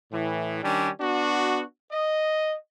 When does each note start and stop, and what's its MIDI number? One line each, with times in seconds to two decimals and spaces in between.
0.12 0.60 45
0.12 0.60 52
0.62 0.88 51
0.62 0.88 55
0.62 0.88 61
0.62 0.88 62
1.00 1.62 59
1.00 1.62 62
1.00 1.62 66
1.91 2.55 75